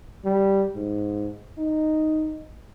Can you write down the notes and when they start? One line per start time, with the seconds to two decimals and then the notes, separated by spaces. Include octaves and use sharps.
0.25 G3
0.75 G#2
1.58 D#4